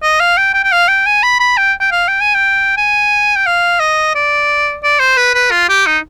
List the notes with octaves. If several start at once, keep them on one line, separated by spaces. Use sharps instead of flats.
D#5
F5
G5
G5
G5
F5
G5
G#5
B5
B5
G5
G5
F5
G5
G#5
G5
G#5
G5
F5
D#5
D5
D5
C5
B4
B4
F4
G4
D#4